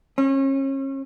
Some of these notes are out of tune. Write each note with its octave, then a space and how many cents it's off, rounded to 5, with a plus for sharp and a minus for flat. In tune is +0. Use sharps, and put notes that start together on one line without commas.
C#4 -35